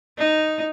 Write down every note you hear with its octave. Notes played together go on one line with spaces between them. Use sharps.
D#4